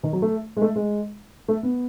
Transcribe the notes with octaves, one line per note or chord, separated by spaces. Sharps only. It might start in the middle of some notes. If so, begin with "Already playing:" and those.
D#3
F#3
A3
G#3
A3
G#3
A3
B3